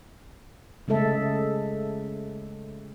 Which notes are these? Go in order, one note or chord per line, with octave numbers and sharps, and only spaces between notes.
C#3 G#3 A3 A4 E5